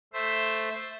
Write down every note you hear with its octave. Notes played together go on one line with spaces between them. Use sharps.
A3 C5 E5 C6